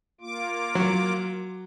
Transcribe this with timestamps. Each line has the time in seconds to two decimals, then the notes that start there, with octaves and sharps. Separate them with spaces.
0.21 A#3 F4 D6
0.75 F#3